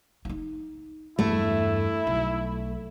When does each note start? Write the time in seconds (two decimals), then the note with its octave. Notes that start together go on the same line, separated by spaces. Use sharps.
0.25 D#4 E4
1.19 E2 G2 A3 E4
2.07 B1